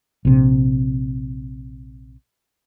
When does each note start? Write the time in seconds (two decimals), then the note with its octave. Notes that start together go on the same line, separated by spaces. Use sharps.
0.25 A#1 C3